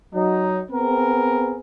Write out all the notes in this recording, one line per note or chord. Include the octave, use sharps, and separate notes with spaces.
F#3 D#4
B3 C4 G#4 A#4